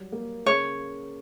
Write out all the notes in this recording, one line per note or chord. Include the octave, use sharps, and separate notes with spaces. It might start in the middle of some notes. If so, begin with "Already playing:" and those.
Already playing: F#3 G3
A#3
C#3 C#5